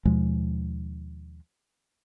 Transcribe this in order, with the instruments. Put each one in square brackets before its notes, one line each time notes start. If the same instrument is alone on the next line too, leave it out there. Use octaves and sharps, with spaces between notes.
[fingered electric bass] D#2 B2 F3 G#3